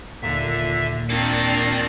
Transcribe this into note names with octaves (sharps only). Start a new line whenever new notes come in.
D#2 A#2 D3 E5
D#3 A#3 C4 D4 F4 D5